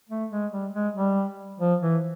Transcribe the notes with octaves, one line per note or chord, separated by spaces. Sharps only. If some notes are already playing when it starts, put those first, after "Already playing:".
A3
G#3
G3
G#3
G3
F3
E3